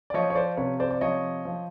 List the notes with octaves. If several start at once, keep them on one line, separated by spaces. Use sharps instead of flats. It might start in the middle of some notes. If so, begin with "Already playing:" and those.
D5
F3 C#5 D#5
C#5
C5 D5
C3 B4 C#5
C5 D5
D5
F3 C#5 D#5
F3